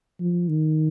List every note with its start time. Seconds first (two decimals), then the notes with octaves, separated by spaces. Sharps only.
0.20 F3
0.49 D#3